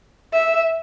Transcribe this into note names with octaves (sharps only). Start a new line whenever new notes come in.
E5